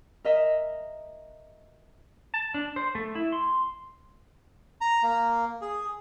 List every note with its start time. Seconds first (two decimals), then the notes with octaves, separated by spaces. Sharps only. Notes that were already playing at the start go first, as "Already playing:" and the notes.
0.25 A#4 D#5 E5
2.34 A5
2.54 D4
2.76 C5
2.95 A3
3.15 E4
3.33 C6
4.81 A#5
5.03 A#3
5.61 G#4